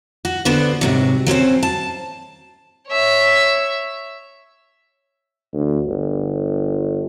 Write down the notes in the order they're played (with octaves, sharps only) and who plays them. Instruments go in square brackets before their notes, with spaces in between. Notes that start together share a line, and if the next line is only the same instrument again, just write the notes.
[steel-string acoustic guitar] F#4
D3 B3 D4 F#4 C5
G#2 C3 F#3
F#3 C4 C#4 C5
A5
[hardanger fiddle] C#5 E5
[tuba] D2
G1